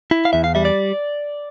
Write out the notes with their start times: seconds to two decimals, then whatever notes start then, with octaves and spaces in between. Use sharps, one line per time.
0.11 E4
0.25 F5
0.33 E2 E5
0.44 F5
0.55 G3 E5
0.65 D5